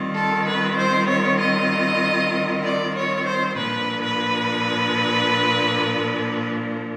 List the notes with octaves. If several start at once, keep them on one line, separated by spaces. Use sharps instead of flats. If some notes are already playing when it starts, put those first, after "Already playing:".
Already playing: D#3 G3 C4 F4
A4
B4
C5
C#5
D#5
D5
C#5
C5
A#2 F3 A#3 D4 B4
B4